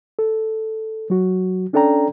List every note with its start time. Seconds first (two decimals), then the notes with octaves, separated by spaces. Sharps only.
0.19 A4
1.10 F#3 F#4
1.73 C#4 D4 A4 D5 G5 A#5